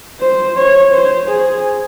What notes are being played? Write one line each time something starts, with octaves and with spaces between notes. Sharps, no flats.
C5
C#5
C5
G#4